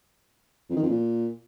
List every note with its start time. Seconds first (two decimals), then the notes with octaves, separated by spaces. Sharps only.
0.70 F2
0.76 D#3
0.83 F2
0.89 A#2